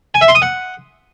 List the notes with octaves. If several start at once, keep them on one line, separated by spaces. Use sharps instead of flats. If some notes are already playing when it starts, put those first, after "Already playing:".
G#5
E5
C6
D#6
F#5